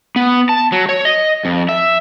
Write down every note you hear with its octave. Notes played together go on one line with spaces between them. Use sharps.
B3
A5
F#3
C#5
D#5
F2
E5